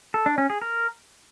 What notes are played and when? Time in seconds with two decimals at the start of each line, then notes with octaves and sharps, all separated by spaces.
0.14 A4
0.26 D4
0.38 C#4
0.50 G#4
0.62 A#4